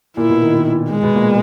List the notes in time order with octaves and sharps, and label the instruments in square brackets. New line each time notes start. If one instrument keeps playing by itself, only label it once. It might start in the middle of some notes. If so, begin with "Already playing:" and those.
[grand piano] A#2 A#3 [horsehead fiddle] E4
[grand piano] B2 B3
D#3 D#4
D#3 D#4
[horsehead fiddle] G#3
[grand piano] B2 B3
A#2 A#3